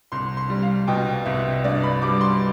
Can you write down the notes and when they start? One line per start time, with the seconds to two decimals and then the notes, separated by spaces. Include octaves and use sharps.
0.12 C2 C6
0.37 C6
0.50 G3
0.62 F5
0.87 B2 G5
1.26 C2 E5
1.64 G2 D5
1.83 B5
2.02 G3 D6
2.21 C6